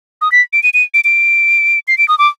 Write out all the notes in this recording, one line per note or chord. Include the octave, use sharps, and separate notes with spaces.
D#6
B6
D7
D#7
D#7
D7
D7
C7
D7
D#6
D6